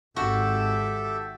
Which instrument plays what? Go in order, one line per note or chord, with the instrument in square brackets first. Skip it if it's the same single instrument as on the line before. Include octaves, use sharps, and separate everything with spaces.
[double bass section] G#1 [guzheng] F#4 [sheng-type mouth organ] G4 A4 E5